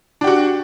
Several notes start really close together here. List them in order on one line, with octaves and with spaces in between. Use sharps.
D4 G4 F#4